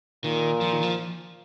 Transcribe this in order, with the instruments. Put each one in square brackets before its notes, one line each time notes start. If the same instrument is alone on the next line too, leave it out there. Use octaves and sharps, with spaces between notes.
[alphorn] A#2 [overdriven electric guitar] D#3
[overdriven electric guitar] F3
D#3
F3